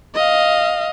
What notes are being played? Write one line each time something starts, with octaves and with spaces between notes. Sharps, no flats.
D#5 F5